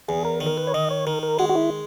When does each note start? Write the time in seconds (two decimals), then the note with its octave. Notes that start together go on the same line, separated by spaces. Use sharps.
0.08 E2 G#4
0.25 A#4
0.41 D#3
0.46 A#4
0.57 B4
0.67 C#5
0.74 D#3 D#5
0.90 C#5
1.07 D#3 A#4
1.23 A#4
1.39 G#3 F#4
1.49 F#4
1.55 E4